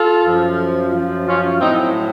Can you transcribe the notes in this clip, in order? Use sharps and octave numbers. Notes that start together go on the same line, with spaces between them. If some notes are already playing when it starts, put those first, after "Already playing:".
Already playing: F4 A4
F#2 F3
F#2 F3
C#4 F4
A2 F#3 C4 D#4